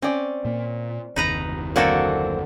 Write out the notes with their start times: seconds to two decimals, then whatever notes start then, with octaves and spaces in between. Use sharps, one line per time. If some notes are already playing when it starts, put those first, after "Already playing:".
0.02 C4 C#4 D5
0.45 A#2 A#3
1.16 F#1 D#2 C3 D#4 B4 A#5
1.76 D3 F#3 A#3 C4 F#4 A4